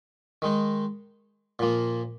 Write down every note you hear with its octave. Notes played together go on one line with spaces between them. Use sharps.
D#3 G#3 D#4
A#2 F3 A#3